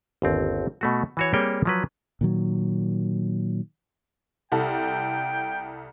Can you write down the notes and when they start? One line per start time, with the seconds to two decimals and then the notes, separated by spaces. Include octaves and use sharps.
0.22 G1 D#2 C4
0.81 B2 A3 F#4
1.17 E3 F#4 C#5
1.33 G3 A#3 C4 G#4 C#5 G5
1.65 F3 F#3 B4
2.21 A#2 D#3 F#3
4.52 C2 A4 G5